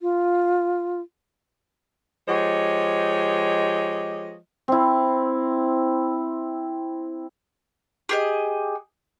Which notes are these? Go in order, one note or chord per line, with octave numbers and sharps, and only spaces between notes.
F4
F3 G#3 G4 C#5 D#5
C4 E4
G4 G#4 D#5